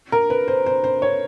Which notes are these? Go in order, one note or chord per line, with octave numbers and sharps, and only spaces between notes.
A#4
B4
C5
C5
C5
C#5